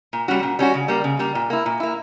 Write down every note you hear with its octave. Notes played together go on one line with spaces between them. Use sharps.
A#2
G3 C#4 F#4
A#2
G3 C#4 F#4
C#3
G3 A#3
C#3
G3 A#3
A#2
A#3 E4
A#2
A#3 E4